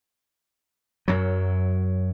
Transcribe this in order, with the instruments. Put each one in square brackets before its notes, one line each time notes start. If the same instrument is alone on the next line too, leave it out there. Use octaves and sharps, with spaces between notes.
[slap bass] F#2 F#3